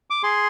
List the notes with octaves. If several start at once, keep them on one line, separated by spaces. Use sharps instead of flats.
D6
G#4 C6